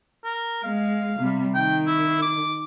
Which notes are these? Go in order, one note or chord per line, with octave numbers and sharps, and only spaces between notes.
A#4
G#3 F5
C3 G3
D#3 G5
E4
D6